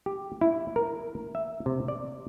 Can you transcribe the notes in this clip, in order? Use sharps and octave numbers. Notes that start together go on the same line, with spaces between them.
G4
E4
A#4
E5
C3
D5